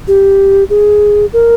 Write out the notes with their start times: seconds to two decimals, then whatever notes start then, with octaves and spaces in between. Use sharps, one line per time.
0.08 G4
0.70 G#4
1.33 A#4